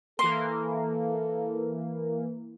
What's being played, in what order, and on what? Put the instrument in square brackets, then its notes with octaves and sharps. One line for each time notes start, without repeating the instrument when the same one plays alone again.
[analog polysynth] E3 A#3 [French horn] A4 [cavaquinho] C6